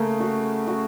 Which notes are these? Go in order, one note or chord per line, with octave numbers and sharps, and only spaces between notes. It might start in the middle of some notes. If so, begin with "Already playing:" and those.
Already playing: C#3 A3 A#3
F#4
F#4